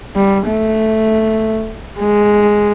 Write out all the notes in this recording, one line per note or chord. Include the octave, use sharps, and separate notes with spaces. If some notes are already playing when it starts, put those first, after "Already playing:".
G3
A3
G#3